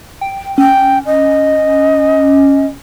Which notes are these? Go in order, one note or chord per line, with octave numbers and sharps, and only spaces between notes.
G5
C#4 G5
D#5